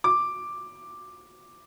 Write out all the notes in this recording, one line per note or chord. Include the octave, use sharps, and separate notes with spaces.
D6